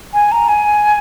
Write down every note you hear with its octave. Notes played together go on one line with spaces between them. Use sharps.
G#5
A#5
G#5